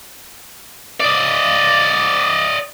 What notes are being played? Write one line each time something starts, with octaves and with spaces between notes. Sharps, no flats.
D5 D#5